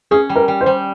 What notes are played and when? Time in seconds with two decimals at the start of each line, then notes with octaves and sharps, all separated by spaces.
0.11 C#4 G#4
0.30 G3
0.36 A#4
0.48 G3
0.61 C5
0.66 G3